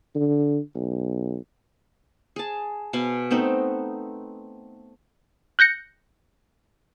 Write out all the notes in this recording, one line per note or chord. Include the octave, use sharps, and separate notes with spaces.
D3
B1
G#4 A5
B2 B4 F5 G#5
A3 B3 C4 D#4
F#6 G6 A#6 C#7